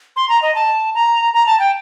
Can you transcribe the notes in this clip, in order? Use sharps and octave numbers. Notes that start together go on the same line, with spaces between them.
C6
A#5
D#5
A5
A#5
A#5
A5
G5